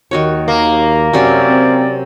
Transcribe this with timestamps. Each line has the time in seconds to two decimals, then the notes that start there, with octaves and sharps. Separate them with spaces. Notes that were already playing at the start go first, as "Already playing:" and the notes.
0.11 D#2 D#3 F#4 C#5
0.48 A#3
1.13 F#2 C3 F#3 C#4 D5
1.48 C4